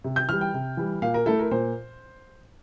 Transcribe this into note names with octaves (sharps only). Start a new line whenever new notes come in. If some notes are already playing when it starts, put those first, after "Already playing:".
C3
G6
E3 G3 F6
G5
C3
E3 G3
A#2 F5
A#4
A3 E4 A4
A#4
A#2 C5